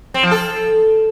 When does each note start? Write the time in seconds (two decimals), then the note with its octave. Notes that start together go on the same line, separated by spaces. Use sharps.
0.14 C4
0.23 F3
0.31 A4